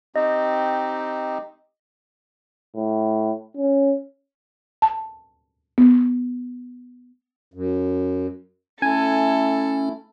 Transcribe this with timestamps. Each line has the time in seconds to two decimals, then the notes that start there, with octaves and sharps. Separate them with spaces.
0.16 C4 D#4 G4 D#5
2.76 A2
3.57 C#4
4.82 A5
5.78 B3
7.54 F#2
8.82 A3 C#4 E4 A4 G#5